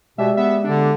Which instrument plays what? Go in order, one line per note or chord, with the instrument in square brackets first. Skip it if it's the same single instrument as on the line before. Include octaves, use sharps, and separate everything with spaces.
[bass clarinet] B2 [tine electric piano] G#3 G4 D5 [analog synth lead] E5
[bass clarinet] B3 [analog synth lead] E5
[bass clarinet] D3 [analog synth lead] D4